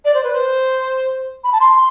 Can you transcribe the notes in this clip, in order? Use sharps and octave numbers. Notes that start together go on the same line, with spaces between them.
D5
C5
B4
C5
B5
A5
C6